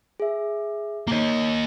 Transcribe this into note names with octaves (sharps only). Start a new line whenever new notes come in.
G#4 E5
A#3 D#4 C#5 A#5